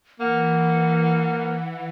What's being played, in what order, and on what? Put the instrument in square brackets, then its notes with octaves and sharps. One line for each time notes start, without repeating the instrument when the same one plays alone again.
[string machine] E3 [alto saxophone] A#3 [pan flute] F#5